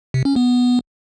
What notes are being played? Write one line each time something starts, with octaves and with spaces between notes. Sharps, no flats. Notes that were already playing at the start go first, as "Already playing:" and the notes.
C3
C#4
B3